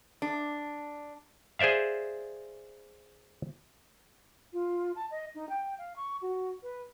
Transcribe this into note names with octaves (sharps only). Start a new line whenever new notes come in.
D4
G#4 C5 D5 E5 F5
F4
A5
D#5
D#4
G5
F5
C#6
F#4
B4